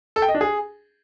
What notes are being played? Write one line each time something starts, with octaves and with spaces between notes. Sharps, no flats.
A4
G5
D#5
D4
G#4